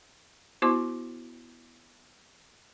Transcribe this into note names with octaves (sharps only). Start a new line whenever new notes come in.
B3 E4 F#4 C5 C6 D6